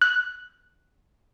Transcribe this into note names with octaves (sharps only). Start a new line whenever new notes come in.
F#6